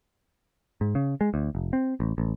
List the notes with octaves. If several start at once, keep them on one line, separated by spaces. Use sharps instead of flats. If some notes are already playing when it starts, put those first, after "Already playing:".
G#2
C#3
G#3
D2
F1
C4
A1
A1